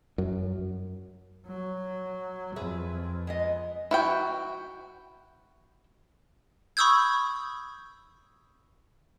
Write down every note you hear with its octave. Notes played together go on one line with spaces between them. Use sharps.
F#2
F#3
F2 G#4 B4 E5
G#3 B3 D#5
E4 F#4 G5
B5 C#6 D#6 E6 G6 G#6